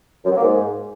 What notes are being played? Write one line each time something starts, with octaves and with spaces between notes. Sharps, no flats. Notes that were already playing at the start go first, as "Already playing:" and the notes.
F#2
F#3
A#3
G#2